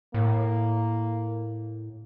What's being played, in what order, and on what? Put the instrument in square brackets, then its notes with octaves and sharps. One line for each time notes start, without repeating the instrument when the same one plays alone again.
[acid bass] A2 [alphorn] A#3